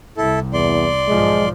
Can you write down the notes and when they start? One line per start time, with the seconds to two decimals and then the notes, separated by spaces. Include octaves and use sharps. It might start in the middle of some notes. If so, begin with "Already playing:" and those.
0.17 C2 E4 A4
0.53 E2 D5 C6
1.08 B1 G#2 F3 G#3